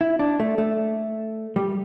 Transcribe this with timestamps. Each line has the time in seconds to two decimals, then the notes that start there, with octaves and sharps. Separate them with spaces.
0.01 E4
0.19 D4
0.40 A3
0.58 A3
1.56 G3